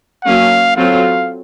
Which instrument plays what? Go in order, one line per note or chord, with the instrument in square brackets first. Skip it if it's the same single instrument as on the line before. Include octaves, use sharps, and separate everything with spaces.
[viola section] F#3 A#3 C#4 [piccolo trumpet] F5
[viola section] F#3 C4 F4 A4 [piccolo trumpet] F5